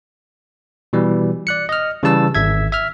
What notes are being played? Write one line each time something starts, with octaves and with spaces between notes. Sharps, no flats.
B2 E3 G3
D5 F#6 C#7
D#5 F6
C#3 E3 G3 A5 E6
G#1 E5 G#6
E5 F6